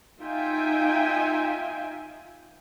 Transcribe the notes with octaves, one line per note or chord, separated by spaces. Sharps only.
D#4 F4 E5 G5 G#5